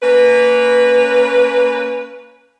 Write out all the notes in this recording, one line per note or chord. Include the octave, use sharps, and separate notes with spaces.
A#3 C#4 B4